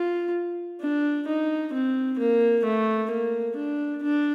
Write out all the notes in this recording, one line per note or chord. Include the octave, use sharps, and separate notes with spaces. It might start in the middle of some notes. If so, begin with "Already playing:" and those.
Already playing: F4
D4
D#4
C4
A#3
A3
A#3
D4
D4